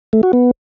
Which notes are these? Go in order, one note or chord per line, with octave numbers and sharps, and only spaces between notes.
A3
F#4
B3